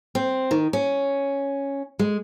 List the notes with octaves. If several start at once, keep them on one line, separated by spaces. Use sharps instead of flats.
C4
D#3
C#4
G#3